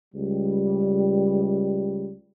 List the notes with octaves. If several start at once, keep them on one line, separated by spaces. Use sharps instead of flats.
C#2 G3